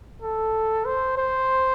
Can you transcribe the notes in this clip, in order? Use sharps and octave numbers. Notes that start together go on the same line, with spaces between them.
A4
C5
C5